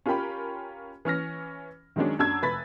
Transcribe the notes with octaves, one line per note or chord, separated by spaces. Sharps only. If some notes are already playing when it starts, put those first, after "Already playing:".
C#4 F4 G4 A#4 G5 B5
E3 C#4 F6 A#6
D#3 F#3 G#3 C#4 D4
F#2 D4 A5 E6 G#6
F1 B4 B5 A6 B6